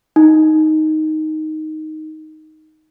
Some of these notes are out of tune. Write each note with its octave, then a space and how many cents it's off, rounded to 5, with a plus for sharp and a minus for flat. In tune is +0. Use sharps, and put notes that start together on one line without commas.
D#4 +0